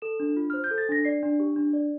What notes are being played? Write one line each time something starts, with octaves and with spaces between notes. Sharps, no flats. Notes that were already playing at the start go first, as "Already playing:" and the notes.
A4 E7
D4
F4
C5 F6
G6
A4
A6
D4 A#6
D5 C7
D4
G4
D4
D5